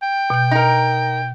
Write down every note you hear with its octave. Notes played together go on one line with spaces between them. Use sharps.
G5
B2 G6
D#4 A#4